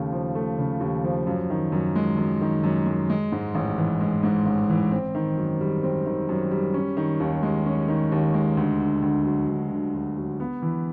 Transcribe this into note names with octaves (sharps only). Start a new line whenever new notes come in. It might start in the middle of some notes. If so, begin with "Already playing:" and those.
Already playing: D#2 C#3 A3
F3
A3
C#3
D#2
F3
F#2
D#3
F#2
G#3
F#2
D#3
F#2
G#3
G#3
G#2
A1
E3
G#3
G#2
A1
E3
C4
D#3
F#2
G3
C4
D#3
F#2
G3
C#4
D#3
D#2
G#3
C#4
D#3
D#2
G#3
D2
D3
D2
F#3
D2
D3
D2
F#3
B3
E3